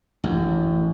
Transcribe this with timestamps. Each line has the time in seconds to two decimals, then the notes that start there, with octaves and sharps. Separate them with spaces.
0.24 A1 F#2